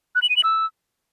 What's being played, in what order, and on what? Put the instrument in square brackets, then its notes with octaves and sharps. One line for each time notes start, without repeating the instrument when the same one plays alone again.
[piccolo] F#6
F#7
D#7
F#7
E6